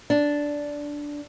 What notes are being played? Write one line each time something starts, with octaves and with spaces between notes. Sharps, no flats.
D4